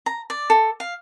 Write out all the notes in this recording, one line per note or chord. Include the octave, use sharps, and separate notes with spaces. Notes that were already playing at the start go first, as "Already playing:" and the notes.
A#5
D5
A4
F5